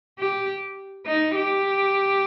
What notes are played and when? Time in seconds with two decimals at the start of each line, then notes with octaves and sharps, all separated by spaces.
0.19 G4
1.06 D#4
1.35 G4